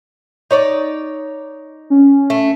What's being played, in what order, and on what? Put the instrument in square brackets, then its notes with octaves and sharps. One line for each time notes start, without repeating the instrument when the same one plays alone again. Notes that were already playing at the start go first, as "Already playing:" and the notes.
[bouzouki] D#4 C#5 D5
[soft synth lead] C#4
[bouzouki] A3